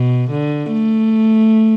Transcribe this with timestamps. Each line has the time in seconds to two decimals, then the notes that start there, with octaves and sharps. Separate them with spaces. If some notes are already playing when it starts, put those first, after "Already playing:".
Already playing: B2
0.31 D3
0.73 A3